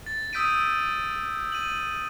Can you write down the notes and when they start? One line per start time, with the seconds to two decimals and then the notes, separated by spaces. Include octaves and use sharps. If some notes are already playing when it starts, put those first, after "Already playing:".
0.06 A6
0.33 D#6 E6 G6 B6 D7 D#7
1.52 D#7 F#7